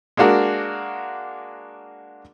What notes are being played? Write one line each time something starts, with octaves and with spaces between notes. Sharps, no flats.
G#3 A#3 D4 F#4 A#4